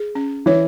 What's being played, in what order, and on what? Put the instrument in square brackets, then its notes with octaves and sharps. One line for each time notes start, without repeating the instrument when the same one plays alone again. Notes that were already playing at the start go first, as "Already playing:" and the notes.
Already playing: [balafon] G#4
C#4
[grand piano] E3 [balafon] C#5